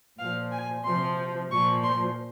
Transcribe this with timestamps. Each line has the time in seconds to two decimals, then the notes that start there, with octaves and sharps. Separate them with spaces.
0.19 A#2 F3 F5
0.52 G#5
0.84 C3 F3 C6
1.50 A#2 F3 C#6
1.84 C6